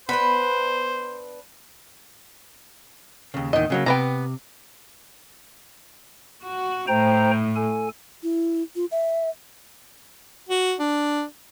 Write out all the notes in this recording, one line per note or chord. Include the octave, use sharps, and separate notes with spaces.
B3 D4 B4 C5 B5
D#2 C#3
E2 A#2 D#3 D#5
C#3 F#3 A#3
C3 B3 B4 G5 A#5
F#4
A2 C5 G5 A#5
A4 G#5
E4
F4
E5
F#4
D4